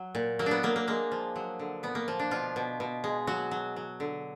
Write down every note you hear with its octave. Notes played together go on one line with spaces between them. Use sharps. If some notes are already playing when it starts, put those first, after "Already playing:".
Already playing: F#3
A#2
F#3 A#3
B3 D4
F#3 A#3
A#3
G#3 A#3
F3
F#3
D3
A#2 B3
A#3
F3
D4
B2 F4
B2
B2
G#3
F#3 F#4
F#3
F#3
D3